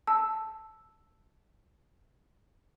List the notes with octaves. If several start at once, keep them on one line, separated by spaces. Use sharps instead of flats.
A5 E6